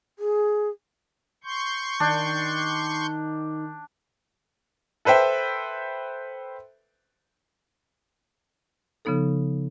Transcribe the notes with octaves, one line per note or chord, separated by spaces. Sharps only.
G#4
C6 C#6 G6
D#3 D4 G5
A4 B4 C5 E5 G5
C#3 F3 B3 D#4 A4